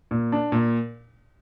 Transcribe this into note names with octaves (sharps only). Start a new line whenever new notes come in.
A#2
D4
A#2